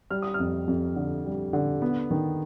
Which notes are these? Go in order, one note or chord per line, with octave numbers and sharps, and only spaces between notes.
G3 F6
D#6
F6
F2
F2
D3
G3
D3
B3
D#3